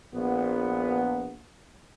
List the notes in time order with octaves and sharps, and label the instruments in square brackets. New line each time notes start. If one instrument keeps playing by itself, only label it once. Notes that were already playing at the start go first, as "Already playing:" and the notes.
[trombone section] A#1 B3